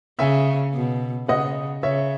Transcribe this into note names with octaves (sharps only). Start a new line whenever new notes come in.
C#3 E5 G#5
B2
C#3 D#5 F#5
C#3 C#5 E5